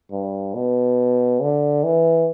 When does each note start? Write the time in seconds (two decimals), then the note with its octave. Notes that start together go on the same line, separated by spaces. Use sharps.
0.11 G2
0.55 B2
1.41 D3
1.84 E3